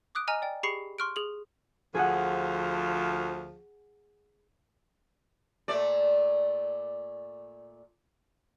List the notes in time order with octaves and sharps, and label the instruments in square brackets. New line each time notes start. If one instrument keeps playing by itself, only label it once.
[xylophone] D6 D#6 F#6 D7
D#5 G#5 A#5 F6 D#7
D5 G5
G4 G#4 B5 C#6 C7 C#7
C6 C#6 F6 F#6 D7
G#4 F#7
[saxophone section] D2 F3 [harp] G#4 F#5
[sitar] A#2 A3 D5